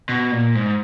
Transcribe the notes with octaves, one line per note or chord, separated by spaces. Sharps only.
B2
A#2
G#2